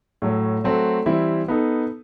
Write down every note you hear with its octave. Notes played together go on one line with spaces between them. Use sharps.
A2 F#3 A3
F#3 A3 C4 F#4 A4
E3 G3 C4 E4
B3 D#4 A4